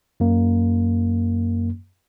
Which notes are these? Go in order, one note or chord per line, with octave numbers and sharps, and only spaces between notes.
F#2 A#3